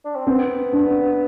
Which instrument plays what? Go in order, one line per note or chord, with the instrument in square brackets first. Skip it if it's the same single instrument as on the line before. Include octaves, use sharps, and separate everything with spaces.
[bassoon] D4
C4
[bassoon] B3 [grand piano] C4
[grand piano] D4